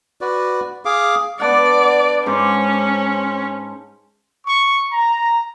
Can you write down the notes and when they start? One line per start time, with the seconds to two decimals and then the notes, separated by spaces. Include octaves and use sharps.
0.21 F#4 B4 D5
0.85 G#4 F5 D6
1.40 B3 D4 D5 F#5
2.26 G#2 C#4 C5 D6
4.47 C#6
4.92 A#5